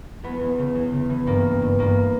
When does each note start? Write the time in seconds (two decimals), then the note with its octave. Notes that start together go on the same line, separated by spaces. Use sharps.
0.23 E2 B3
0.41 E2
0.58 C#3
0.75 E2
0.93 C#3
1.10 E3
1.27 G2 A#3
1.45 G2
1.62 G2
1.79 G2 A#3